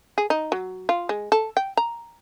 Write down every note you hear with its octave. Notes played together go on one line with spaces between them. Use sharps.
G#4
D#4
F#3
F4
G#3
A4
G5
A#5